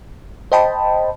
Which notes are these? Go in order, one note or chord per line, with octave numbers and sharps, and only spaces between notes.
C5 D#5 G5 A5 B5